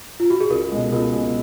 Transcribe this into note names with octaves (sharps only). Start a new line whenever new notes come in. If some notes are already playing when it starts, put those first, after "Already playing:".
F4
F#4
G#4
C#2 A#4
B2 G#3
C#2 A#4
B2 G#3